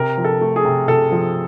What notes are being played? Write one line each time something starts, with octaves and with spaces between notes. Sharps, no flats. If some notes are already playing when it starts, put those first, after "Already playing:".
Already playing: C3 A#4
F3
A4
A3
G#4
C3
C3 A4
F3